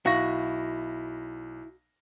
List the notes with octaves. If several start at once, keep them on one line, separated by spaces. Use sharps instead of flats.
B1 E4 F#4 F5 A#6